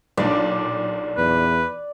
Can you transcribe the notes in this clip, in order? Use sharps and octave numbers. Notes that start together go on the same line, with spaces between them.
B1 A#2 D4 D5
E2 B4